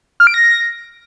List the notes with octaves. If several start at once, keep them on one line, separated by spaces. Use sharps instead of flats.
F6
D7
A#6